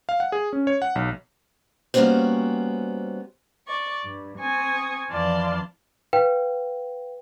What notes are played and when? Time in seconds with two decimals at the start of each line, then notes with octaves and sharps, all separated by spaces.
0.09 F5
0.20 F#5
0.32 G#4
0.53 C#4
0.67 C#5
0.82 F#5
0.96 B1
1.94 G3 A#3 B3 C#4 F#4 C5
3.65 D5 C#6
4.04 G2
4.39 C4 G#5 C#6 D#6
5.12 F2 E3 D5 F5 A5 C6
6.13 B4 F5 G5